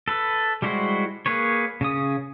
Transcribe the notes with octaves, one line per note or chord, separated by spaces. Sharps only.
A4 B4
G3 G#3 E4 F#4 C5
A#3 G#4 B4 C#5
C#3 C#4 D#6